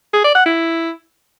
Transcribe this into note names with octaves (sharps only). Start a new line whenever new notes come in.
G#4
D5
F#5
E4